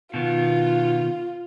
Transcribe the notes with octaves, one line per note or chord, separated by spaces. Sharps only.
B2 D#3 B3 F4